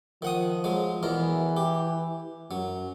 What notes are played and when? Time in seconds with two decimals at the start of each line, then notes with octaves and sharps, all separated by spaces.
0.22 D#3 F3 F#5 D#6
0.64 F#3 G#3
1.03 E2 B2 E3 A#4
1.57 G4
2.51 F#2 F#3